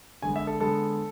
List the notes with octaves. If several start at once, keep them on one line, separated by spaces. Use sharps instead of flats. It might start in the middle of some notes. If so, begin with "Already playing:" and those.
D3 G#3 B3 G#5
E5
A4
D3 G#3 B3 A4